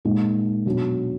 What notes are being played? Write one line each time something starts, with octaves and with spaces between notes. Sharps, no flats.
A#2 G#3 D#4
B2 F#3 D4